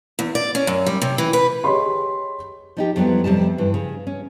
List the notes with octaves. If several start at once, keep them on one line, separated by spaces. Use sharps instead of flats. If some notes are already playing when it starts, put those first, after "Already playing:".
E2
D5
C#4
F#2
G3
C3
E3
B4
G4 G#4 C#5 D#5 B5 C6
F3 D#4 G4
F2 F#3 G3 B3 E4
F2 C3 G3 A5
G2 E3
C#3
C#4